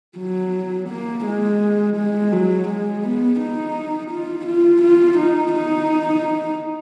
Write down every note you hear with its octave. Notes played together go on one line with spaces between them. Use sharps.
F#3
A#3
G#3
G#3
F#3
G#3
B3
D#4
F4
F4
F4
D#4
D#4